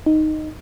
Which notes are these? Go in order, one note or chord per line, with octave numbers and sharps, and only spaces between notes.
D#4